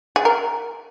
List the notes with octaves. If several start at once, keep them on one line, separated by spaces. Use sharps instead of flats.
G#4
A#4